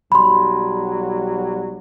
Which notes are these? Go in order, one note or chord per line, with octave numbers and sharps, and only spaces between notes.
B1 F#3 G3 B5 C6